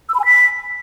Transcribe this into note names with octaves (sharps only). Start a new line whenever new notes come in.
E6
B5
G#5
B6